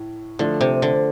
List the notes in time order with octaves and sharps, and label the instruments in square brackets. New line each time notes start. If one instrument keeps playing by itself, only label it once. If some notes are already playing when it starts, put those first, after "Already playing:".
Already playing: [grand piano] A2
[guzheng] D3 [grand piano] F3 A3 D4 F4
[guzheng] C3
D3